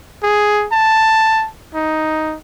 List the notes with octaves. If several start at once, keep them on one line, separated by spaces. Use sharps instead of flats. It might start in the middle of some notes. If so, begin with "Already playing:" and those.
G#4
A5
D#4